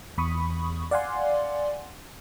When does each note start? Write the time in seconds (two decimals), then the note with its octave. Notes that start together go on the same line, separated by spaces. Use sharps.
0.18 E2 B5 C#6 D#6
0.91 D5 F5 F#5 G#5 C6